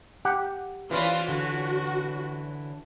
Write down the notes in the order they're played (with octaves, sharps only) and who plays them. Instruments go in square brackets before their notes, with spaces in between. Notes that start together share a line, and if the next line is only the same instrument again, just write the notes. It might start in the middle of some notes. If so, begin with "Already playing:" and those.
[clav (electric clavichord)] G4 F#5
[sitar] E3 C#4 E4 [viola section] F4 [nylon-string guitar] C5 D5
[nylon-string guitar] D3 [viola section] F#4